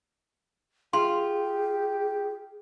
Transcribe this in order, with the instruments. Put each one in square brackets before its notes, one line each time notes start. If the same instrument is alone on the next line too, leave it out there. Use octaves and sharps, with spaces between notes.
[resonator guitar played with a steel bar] F4 [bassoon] G4 [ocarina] G#4 [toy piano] C6